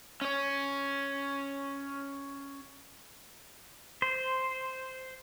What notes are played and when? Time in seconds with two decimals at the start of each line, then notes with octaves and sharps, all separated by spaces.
0.21 C#4 C#5
4.02 C5